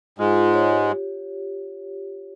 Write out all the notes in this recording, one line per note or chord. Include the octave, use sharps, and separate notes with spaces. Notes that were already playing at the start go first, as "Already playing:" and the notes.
G#2 G#3 F4
F4
C#5
G4
G4